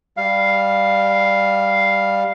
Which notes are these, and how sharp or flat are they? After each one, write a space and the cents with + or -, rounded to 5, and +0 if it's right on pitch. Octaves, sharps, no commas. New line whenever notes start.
G3 +5 F5 +0